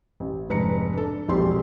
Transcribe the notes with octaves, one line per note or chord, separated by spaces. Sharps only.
A1
F1 G#2 B4 A#5 C#7
D4 A4
E1 A#1 F2 G4 C6